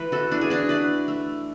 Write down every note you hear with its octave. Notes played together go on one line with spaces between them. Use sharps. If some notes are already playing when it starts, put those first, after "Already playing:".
Already playing: E3 A3 B4
F#4 A4
E3 D4
G#4
D4 F#4
A3 B4 D5
A3